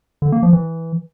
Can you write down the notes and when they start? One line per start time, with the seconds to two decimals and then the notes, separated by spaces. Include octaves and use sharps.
0.22 D3
0.32 A#3
0.43 F3
0.53 E3